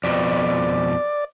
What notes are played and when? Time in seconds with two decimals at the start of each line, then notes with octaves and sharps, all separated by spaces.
0.04 F2 B2 D5